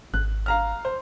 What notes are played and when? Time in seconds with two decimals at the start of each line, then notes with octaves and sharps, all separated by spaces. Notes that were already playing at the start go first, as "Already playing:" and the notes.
0.14 G#1 F#6
0.46 F5 A#5 F6
0.85 C5